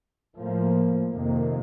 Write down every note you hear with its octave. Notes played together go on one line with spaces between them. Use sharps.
A2 F3 A#3
F2 C3 D#3 A#3